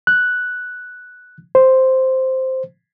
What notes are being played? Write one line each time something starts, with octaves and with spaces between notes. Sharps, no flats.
F#6
C5